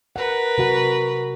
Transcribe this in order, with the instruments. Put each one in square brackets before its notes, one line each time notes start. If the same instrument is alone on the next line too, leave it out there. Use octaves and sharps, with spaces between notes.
[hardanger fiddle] A#4 B4 [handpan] F#5
[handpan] C3 F#4 F#5